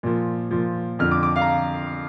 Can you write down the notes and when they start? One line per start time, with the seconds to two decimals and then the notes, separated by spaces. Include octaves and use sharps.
0.03 A#2 F3
0.51 A#2 F3
0.99 F2 D3 F3 F6
1.11 D6
1.23 D6
1.36 F5
1.41 A#5